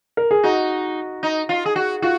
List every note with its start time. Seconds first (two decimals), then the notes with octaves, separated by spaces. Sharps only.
0.17 A#4
0.31 G#4
0.43 D#4 F#4
1.23 D#4
1.49 F4
1.66 G#4
1.76 F#4
2.02 F4 F#4